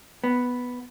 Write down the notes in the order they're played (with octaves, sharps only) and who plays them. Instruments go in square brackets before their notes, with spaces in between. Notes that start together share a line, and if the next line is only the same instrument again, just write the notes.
[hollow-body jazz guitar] B3